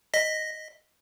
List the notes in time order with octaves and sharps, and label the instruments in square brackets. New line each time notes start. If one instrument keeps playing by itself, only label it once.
[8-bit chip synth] D#5 A#6 B6